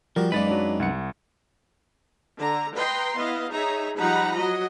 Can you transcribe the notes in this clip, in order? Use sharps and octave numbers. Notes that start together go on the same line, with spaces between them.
F3 G3 F#4 A#4
F#2 G#3 A#3 D#4 B4 D5 A6 B6
F#3 D4 D5
C2 F#5 C#7
D3 A#5
B4 D#5 G5 A#5 C6
B3 E4 D#5 F5
D#4 G#4 C#5 E5 A#5
F3 G3 D#4 F#5 A#5 B5
F#3 F#4 D#5